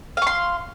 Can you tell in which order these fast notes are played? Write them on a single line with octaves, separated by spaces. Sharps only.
F5 C#6 C6